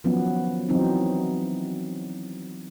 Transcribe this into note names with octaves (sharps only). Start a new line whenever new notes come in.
D#3 F3 F#3 B3 C#4
E3 F#3 C4 D#4